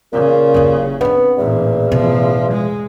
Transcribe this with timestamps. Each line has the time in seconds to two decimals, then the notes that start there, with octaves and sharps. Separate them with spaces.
0.13 A#2 C#3
0.54 F#1 D#2
1.01 B3 C4 D4
1.38 A1 E2 A#2
1.92 A1 B2 F3
2.52 G#3